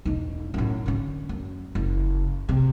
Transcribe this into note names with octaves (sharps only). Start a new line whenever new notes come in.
E1 D#4
F#2 A2
D3 C#4
F#2
F#1
C3